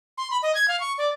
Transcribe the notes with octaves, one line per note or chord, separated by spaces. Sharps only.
C6
B5
D#5
G#6
F5
C#6
D5